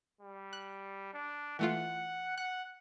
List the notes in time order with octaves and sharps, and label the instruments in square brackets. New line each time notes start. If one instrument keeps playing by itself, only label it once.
[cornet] G3
[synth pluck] F#6
[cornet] D4
[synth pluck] E3 A3 F4 [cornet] F#5
[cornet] F#5 [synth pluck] F#6